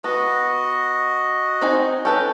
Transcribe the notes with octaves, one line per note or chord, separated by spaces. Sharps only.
B3 F#4 D#5
C4 D#4 G#5
C#4 A4 B4 G5